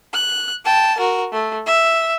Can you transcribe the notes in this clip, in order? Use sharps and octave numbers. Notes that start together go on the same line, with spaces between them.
F#6
G5 A5
F#4 A#4
A3
E5